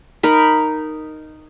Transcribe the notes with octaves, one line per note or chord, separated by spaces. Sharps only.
D#4 A#4 B5